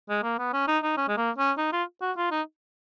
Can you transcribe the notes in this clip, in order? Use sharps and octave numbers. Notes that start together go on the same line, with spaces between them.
G#3
A#3
B3
C#4
D#4
D#4
C#4
G#3
A#3
C#4
D#4
F4
F#4
F4
D#4